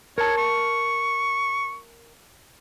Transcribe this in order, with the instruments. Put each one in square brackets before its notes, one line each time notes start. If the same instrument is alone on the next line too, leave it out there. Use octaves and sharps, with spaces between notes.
[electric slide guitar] A#4 A5 [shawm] C#5
[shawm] C#6